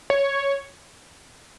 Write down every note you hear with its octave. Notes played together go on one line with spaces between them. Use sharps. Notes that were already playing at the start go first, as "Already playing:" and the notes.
C#5